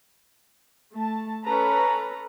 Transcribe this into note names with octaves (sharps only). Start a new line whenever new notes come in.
A3 A5
C#4 A4 B4 A#5